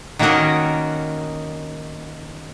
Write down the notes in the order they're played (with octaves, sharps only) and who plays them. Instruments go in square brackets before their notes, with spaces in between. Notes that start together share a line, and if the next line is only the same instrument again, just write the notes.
[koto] D#3 A#3 C#4 F#4 A#4 D#5